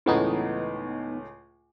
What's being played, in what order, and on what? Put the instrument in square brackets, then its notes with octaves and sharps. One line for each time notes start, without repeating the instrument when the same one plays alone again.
[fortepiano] C#2 A2 [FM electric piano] E3 B3 D#4